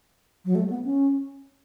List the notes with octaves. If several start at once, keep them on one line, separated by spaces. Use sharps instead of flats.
F#3
A3
B3
C#4